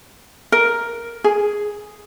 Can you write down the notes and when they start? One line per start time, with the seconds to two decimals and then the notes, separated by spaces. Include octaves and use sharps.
0.52 A#4
1.24 G#4